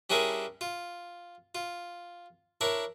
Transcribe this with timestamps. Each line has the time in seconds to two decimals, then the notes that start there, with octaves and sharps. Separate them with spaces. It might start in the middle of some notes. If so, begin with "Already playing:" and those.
0.10 G3 C#4 D4 E4 G#4 A#4
0.61 F4
1.55 F4
2.61 D4 E4 A#4 C#5